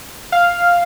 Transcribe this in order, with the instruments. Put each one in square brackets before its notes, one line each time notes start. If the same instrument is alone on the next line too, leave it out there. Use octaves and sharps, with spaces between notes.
[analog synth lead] F5